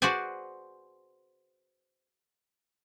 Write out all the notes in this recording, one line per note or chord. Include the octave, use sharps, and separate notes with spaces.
F#4 G#4 B4 C5 D5 G#5